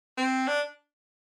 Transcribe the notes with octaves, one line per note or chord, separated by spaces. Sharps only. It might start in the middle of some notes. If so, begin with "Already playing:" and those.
C4
D4